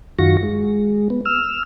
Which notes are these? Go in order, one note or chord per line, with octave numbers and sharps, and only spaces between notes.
F#2 D#3 F4 F#4 C#6 A#6
G#3
B3
E6 F6